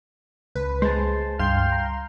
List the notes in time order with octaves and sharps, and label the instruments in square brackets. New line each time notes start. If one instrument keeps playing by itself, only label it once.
[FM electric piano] C#2 [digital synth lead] B4
[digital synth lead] G#3 [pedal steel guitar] C5 A5
[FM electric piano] C#2 G2 [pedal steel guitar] F5 G5 [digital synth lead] C6
[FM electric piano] A#5